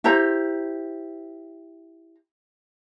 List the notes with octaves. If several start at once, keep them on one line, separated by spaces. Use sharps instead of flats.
E4 G4 C5 A#5